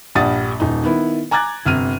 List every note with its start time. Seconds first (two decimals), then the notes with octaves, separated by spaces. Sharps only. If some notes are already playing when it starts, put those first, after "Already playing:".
0.15 A#1 G2 G3 F#5 D#6 A6
0.60 D#1 D#4
0.84 D#3 B3 E4
1.31 G#5 A#5 D6 F#6 G#6 A6
1.65 G1 C3 F6 D#7